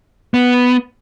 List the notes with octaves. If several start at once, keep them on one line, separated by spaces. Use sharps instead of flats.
B3